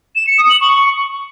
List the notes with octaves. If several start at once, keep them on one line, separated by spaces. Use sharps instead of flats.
E7
C#7
D#6
F#7
C#6